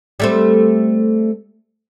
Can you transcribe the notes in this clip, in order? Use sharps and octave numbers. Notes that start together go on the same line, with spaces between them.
G3 A3 C4